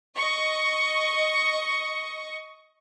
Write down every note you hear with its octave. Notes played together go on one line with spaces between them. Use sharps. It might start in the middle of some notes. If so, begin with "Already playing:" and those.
D#5 C#6